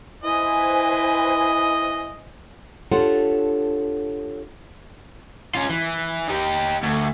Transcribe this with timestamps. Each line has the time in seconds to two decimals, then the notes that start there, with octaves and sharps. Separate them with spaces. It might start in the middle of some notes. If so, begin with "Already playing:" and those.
0.24 E4 B4 C5 D#5 G#5
2.92 D4 F4 G4 A4 C#5 F#5
5.55 C#4 F4
5.70 E3
6.28 D#4 G4
6.83 D2